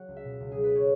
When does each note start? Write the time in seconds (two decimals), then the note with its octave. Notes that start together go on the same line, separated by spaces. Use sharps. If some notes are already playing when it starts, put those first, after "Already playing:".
Already playing: F#3 F#5
0.08 C#2
0.17 E5
0.24 B2
0.40 C#2
0.52 F#3 G#4
0.64 B4
0.75 C#5